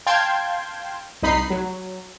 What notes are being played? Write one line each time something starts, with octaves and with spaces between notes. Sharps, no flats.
F5 G5 A5 C6 G6 G#6
C2 D#4 B5 C7
F#3